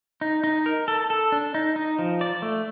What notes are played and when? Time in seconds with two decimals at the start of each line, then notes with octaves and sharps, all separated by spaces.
0.21 D#4
0.44 D#4
0.66 A#4
0.88 A4
1.10 A4
1.32 D4
1.54 D#4
1.76 D#4
1.99 F3
2.21 D5
2.42 A3